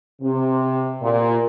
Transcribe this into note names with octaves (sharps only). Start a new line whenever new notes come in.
C3
A#2